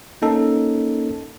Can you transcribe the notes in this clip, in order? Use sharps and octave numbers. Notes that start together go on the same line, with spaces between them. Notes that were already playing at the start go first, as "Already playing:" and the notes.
A#3 C#4 D#4 A4